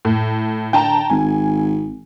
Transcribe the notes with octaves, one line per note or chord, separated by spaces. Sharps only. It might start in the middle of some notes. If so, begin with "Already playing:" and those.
A2
D3 G5 A5 A#5
G#1 G#5